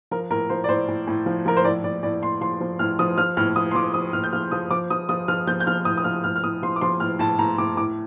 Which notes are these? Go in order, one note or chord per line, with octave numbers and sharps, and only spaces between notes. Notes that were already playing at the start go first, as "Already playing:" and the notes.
F3 A#4
A2 A#4
F3 C5
D5
A2 C5
A2
A2
F3
F3 A#4
C5
A2 D5
A2 D5
A2 D5
A2 C6
F3 C6
F3
A2 F6
F3 D#6
F3 F6
A2 F6
F3 D#6
C6
F3 D6
F3 D#6
A2 F6
G6
F3 F6
F3 D#6
F3 D6
F3 D#6
F3 D#6
F3 F6
F3 G6
G6
F3 F6
A2 D#6
D#6
F3 F6
A2 F6
F6
A2 D#6
F3 C6
D6
F3 C6
A2 F6
A2 A5
A2 A#5
A2 D6
A2 D6